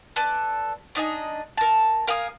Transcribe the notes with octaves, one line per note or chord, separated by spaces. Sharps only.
A4 B4 D5
D4 D#4 D#5 G#5
A#4 A5
A#4 F5 G#5 D#6